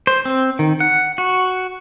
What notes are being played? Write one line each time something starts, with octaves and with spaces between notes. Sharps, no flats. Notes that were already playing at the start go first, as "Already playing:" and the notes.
C5
C4
D#3
F#5
F#4